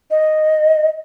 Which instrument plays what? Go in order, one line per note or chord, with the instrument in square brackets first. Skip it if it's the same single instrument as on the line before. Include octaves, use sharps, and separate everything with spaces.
[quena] D#5